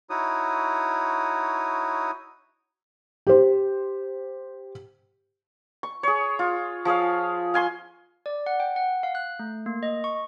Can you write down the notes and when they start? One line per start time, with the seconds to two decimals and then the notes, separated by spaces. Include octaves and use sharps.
0.10 D#4 E4 F#4 C#5 D#6
3.27 G4 C5
5.83 C#6
6.03 G#4 C#5
6.39 F4
6.85 F3 G#4 C#5 F5
7.54 F5 G#5 C6 C#6
8.26 D5
8.46 F#5
8.60 G5
8.76 F#5
9.03 F5
9.15 F#6
9.39 A3
9.66 A#3
9.83 D#5
10.04 C#6